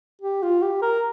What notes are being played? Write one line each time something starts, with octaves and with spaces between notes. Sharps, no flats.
G4
F4
G4
A#4